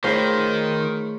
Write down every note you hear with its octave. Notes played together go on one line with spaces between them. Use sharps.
D#3 A3 F4 G#4 C5 C#5 A#5 B5